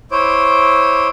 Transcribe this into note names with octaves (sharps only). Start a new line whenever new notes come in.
E4 C5 C#5 D6